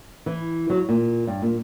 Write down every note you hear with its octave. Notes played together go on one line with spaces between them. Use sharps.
E3
F#3
A#2
G2
A#2